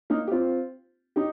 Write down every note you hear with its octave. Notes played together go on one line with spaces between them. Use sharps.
A#3 D#4
G4
C4 F4
D#4 G4